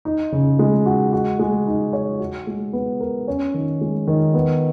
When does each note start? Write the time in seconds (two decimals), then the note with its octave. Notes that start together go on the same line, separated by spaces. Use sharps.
0.05 D#4
0.32 C#3
0.59 G#3
0.86 F#4
1.13 F#4
1.39 G#3
1.67 D#4
1.93 C#5
2.19 F#4
2.47 G#3
2.73 B3
3.00 A#4
3.28 C#4
3.54 D#3
3.81 G#3
4.08 D#3
4.34 B3